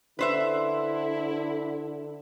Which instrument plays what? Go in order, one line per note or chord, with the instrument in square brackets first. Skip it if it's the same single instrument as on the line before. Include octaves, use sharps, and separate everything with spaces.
[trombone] D3 [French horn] E4 [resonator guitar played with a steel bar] B4 C5 E5